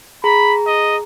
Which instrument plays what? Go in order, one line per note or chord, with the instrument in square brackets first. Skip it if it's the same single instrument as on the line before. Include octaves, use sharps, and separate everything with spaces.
[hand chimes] G#4 A#5 [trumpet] B5
[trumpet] D#5